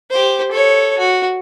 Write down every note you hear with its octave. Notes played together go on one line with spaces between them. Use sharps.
G4 C5
A4 C#5
F#4